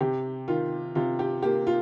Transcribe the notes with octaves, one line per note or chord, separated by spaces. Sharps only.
C3 G4
D#3 F4
C3 F4
G4
A#3 G4
F4